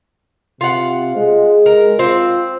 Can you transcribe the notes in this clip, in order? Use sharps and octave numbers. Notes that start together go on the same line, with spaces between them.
C3 F4 F#5
G#3
A#4
C4 F4